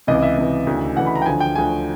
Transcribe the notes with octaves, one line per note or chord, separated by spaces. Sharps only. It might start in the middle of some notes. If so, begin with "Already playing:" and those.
C#2 C3 E3 D#5
E5
C#2 C3 E3
D2 C#3 E3
D2 C#3 E3 F#5
B5
A#5
G5
D2 D3 F3 G#5
G5
D2 D3 F3 G#5